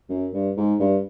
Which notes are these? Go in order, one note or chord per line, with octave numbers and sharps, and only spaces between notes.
F#2
G2
G#2
G2